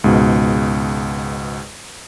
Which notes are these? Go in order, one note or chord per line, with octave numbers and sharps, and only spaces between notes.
C#2 G#2 B2